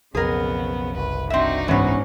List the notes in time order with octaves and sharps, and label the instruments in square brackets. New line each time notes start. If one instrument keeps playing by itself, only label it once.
[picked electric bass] B1 F2 [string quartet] C#3 B3 [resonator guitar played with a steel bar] G#4 A#4
[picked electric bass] F#1 C2 [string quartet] B4
[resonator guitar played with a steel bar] C4 E5 [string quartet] D4 D#4 F#4
[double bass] G#2 C#4 [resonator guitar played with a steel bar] E3 B3